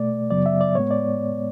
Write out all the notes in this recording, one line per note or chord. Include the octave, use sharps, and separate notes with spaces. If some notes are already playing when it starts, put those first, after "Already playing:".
Already playing: B2 A3 D5
F#2 C#3 F#3 B3 D5
E5
D5
A2 G#3 B3 C#5
D5